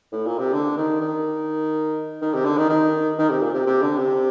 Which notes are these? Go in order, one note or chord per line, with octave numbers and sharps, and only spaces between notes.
A2
A#2
C3
D3
D#3
D#3
D#3
C3
D3
D#3
D#3
D#3
C3
A#2
C3
C3
D3
C3